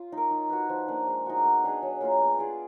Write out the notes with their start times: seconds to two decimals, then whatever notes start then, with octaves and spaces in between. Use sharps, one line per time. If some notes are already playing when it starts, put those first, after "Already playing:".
Already playing: F4
0.12 D#4 A#4
0.31 D#4
0.50 F#4 B4
0.69 F3
0.88 A#3 D4
1.07 G#3
1.26 D#4 F#4
1.45 B3
1.64 D4 G#4 D#5
1.83 F#3
2.01 A#3 F4 A#4
2.20 B3
2.39 F4 G#4 D5